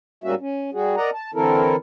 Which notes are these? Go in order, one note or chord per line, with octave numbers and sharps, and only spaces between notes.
G#2 G3 A#3 C#4 F#4 E5
C#4
G3 F#4 G#4
A#4 D5 D#5 F#5 A#5
A5
D3 E3 C4 E4 A4 A#4